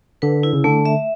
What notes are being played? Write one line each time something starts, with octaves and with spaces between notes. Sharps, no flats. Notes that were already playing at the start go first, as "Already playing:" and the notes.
D3 B4
E4
C#3
D3 A3
E5